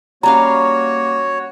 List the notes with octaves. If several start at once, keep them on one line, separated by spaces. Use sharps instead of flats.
G3 A#3 C#4 F#4 C#5 F5 A#5